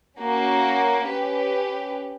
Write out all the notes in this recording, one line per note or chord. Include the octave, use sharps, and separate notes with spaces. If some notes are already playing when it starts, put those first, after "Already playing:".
A#3 C#4 F#4
C#4 G4 B4